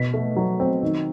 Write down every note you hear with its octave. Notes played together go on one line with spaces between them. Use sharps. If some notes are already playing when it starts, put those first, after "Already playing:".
Already playing: B2 B6
A3
F#3
C4
D#3